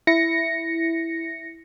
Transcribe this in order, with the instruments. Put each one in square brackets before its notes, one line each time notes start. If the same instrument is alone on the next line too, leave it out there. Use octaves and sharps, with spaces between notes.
[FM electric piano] E4 A#6 C#7